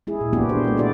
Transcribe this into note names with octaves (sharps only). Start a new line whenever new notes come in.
G#3 E4 G#4
A#2
A#3 B3 D4 E4 F#4 G4
C5
G#3 A3
E4 F#4 D5